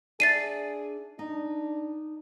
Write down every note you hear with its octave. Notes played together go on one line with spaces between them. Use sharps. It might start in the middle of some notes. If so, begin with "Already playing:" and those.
D4 G#4 D5 E5 A6 C7 D#7
D4 D#4